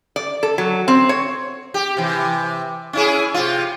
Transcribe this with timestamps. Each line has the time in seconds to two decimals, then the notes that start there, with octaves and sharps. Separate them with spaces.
0.16 D5
0.43 A4
0.58 F#3
0.88 C4
1.09 C#5
1.74 G4
1.97 C3 E3
2.93 C#4 E4 G#4
3.34 C3 F4